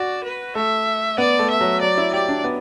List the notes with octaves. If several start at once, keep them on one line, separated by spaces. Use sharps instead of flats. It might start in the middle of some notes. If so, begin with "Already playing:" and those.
Already playing: F#4 D5
B4
A3 E5
B3 D5
A3
E5
F#3
F#3 D5
E4
G4 D5
D4
B3